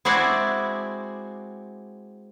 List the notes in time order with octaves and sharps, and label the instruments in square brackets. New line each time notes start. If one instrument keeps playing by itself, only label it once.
[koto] G#3 C4 E4 F#4 D5